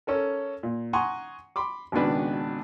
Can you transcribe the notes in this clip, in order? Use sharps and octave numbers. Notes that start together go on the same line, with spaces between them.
C#4 A4 A#4
A#2
F#5 G#5 A#5 C6 C#6 D#6
B5 C6 D6
G#1 C#2 B2 D#3 D4 B4